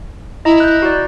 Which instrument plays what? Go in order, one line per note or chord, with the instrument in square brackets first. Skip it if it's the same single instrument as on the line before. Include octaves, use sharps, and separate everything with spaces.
[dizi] E4 [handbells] D#5 A#5
[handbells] F#6 G6
F#4 D5